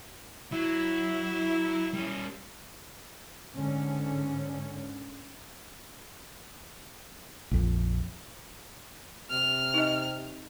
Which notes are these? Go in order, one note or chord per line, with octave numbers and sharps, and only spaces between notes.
F#3 E4
G3 C#4
G#2 D3 C#4
A#1 F2
C3 F6
D#4 D#5